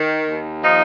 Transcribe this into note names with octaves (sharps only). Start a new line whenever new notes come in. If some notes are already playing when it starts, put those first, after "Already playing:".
Already playing: D#3
D#2
F3 D#4